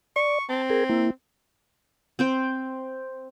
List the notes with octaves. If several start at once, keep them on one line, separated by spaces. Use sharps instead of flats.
D5 C#6
C4 A5
G#4 A#4
A#3 E4
C4 C5 G5